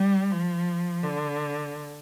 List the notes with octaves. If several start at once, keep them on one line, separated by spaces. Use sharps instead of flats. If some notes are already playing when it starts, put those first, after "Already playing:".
Already playing: G3
F3
D3